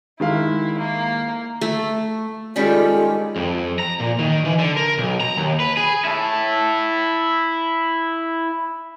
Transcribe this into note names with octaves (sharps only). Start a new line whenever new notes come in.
D#3 G#3 E4 F5
A#3
A3
D#3 G3 G#3 C#4 F4 G4 A4
F2
A#5
A#2
D#3
E3
D3
A#4
B1
A#5
D#2
B4
G#4
E4 A5